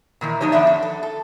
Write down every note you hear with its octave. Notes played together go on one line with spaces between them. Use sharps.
A#2 D#3 E3
F3 D4 D#4 G4 C#5
D#3 A3 B3 D4 D5 E5
F2
A4
A4